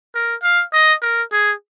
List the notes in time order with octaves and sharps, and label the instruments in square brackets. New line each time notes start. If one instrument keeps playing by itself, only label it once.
[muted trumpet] A#4
F5
D#5
A#4
G#4